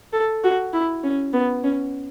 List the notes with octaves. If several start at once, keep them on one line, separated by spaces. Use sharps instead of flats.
A4
F#4
E4
C#4
B3
C#4